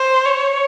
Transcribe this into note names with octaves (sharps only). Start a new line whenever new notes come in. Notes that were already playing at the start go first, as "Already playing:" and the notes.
Already playing: C5
C#5